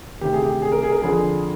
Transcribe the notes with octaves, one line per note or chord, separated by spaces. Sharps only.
D2 C3 D#3 G4
G#4
G4
G#4
A#4
G#4
A#4
F2 D3 G#4